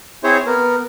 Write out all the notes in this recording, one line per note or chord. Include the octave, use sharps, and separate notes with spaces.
C4 E4 G#4 C5 C#5
B3 A#4